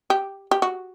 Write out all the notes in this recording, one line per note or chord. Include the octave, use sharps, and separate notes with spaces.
G4
G4
F#4